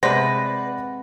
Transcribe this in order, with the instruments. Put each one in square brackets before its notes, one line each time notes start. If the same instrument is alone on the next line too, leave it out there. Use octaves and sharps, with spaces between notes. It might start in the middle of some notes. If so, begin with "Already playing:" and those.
[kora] C3 G#3 [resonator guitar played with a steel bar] B4 [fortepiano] C5 D5 C6 [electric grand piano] F#5 A#6